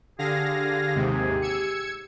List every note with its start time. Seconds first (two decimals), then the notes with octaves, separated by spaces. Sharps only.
0.19 D3 G4 G#4 F5 A#6
0.95 D#2 G#2 C3
1.42 E6 G#6 C#7